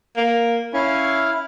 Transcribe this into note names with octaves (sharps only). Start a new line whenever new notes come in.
A#3
C#4 E4 F5